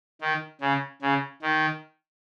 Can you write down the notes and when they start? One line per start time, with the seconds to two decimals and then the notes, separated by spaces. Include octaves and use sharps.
0.21 D#3
0.61 C#3
1.02 C#3
1.42 D#3